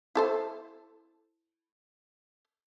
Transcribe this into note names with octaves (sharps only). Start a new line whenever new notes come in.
E4 A4 C5